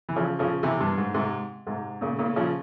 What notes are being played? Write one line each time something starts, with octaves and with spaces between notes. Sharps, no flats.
E3
C#3 F3
C#3 F3
C3 E3
G2
G#2
G#2 C3
G#2 C3
A#2 C#3
A#2 C#3
C#3 F3